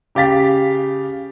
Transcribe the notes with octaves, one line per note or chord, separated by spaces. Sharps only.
C#3 G4 F5 A6 B6